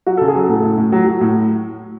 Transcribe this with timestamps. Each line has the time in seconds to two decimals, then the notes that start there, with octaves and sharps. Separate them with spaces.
0.06 F#3 F#4
0.17 A4
0.21 C#3
0.28 G#4
0.35 F#3 A4
0.49 A2 A4
0.63 A2
0.78 A2
0.92 F#3
1.07 F#3
1.21 A2